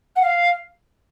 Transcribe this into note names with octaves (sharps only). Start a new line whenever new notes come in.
F#5
F5